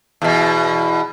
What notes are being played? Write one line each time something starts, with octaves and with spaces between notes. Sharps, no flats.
E2 B2